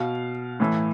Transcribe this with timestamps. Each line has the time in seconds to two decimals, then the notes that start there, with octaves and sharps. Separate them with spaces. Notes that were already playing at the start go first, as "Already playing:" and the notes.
Already playing: B2 F5
0.60 A2 E3